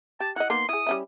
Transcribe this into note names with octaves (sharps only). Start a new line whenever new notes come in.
G4 A5
E4 D#5 F#5
A#3 B3 D#4 C6
E4 G#4 D#6
G3 C#4 E4